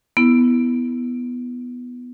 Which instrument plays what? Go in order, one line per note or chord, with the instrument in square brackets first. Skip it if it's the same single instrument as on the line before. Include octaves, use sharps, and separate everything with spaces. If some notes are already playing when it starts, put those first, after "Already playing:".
[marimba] B3 E4